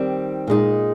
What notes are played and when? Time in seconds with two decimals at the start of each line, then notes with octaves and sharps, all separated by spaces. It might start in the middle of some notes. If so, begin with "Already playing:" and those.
Already playing: D#3 G3 C4
0.47 A#2 G#3 D#4